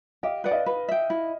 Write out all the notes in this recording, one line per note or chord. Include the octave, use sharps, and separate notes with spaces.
G4 D#5 F5
B4 D5 F#5
D#5 F5
B4
E5 G5
E4